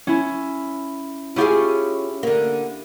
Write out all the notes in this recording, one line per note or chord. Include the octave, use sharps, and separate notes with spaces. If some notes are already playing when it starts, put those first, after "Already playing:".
C#4 E4
C#4 E4 F4 G4 G#4
D3 A#3